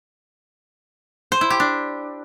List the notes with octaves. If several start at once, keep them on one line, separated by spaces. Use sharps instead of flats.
C5
E4
G4
D4